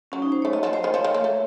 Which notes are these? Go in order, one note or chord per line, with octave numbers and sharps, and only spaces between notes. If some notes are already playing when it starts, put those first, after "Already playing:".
F#3 C#4
D#4
C5
C#5
A3
F#3 D#5
F3
F#3 C5
D#3 D#5
F3 C#5
D#3
A#3
A3